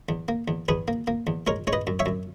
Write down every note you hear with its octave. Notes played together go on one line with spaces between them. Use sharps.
E2
A#3
E2
E2 G#4 B4
A#3
A#3
E2
G#3 A#4 C#5
G#3 C#5
B4 D#5
F#2
C#5 E5
F#2